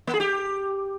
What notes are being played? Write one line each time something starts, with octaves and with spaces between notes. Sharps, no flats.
A#3
G#4
G4